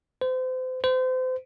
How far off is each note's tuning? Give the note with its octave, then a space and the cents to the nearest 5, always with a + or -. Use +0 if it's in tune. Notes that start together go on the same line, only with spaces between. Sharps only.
C5 -35
C5 -35